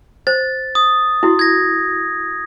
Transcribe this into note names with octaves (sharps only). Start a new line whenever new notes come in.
C5 A6
D#6
E4 F#4
G#6 A#6